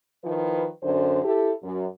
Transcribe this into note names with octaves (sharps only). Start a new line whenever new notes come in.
D#3 F3 E4 B4
F#2 D3 C5
E4 G4 A4
F#2